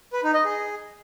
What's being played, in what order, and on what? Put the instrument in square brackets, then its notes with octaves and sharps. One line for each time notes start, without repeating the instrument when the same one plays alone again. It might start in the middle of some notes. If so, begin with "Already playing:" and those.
[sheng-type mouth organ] B4
D#4
D#5
G#4